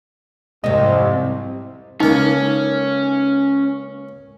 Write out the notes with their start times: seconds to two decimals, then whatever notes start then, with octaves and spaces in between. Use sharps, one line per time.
0.64 C2 F2 G#2 C3 G3 G#3 D#5
2.00 C#2 A#3 C#4 D#4